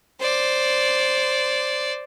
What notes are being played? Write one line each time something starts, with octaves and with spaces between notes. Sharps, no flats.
C5 D5